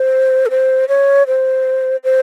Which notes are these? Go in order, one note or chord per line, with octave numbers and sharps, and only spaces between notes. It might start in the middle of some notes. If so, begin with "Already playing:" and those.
Already playing: C5
A4
C5
C#5
C5
C5